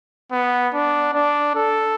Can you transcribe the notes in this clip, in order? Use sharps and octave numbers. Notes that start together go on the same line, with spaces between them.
B3
D4
D4
A4